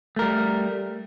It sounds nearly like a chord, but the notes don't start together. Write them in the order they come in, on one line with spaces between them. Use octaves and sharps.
A3 A#4 G3